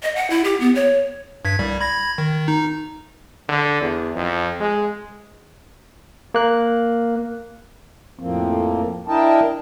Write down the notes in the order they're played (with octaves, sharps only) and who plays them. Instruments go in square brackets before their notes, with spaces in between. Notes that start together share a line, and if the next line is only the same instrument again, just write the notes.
[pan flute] D#5
F#5
E4
G4
B3
C#5
[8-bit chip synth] G2 G#6 B6
C2 G3
B5 G#6 A#6
D#3
D#4
[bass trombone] D3
E2
F2
G#3
[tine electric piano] A#3 F#6
[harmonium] F2 A2 F3 A#3 C4
D4 E4 A#4 D#5 G5 A5